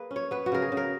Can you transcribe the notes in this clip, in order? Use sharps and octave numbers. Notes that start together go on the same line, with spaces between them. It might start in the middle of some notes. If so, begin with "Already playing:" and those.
Already playing: A#3 G#4 B4
C#4
C#5
B3 B4
F#4
C#3 A#4
G#4
C#3
A#4